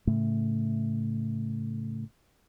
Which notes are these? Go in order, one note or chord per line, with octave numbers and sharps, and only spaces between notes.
A2 C#3 A3